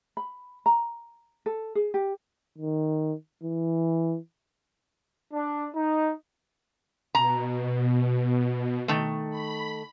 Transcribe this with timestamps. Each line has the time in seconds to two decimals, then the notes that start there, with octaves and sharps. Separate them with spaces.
0.17 B5
0.66 A#5
1.46 A4
1.75 G#4
1.94 G4
2.58 D#3
3.43 E3
5.33 D4
5.74 D#4
7.15 B2 A#5
8.88 D#3 A3
9.31 B5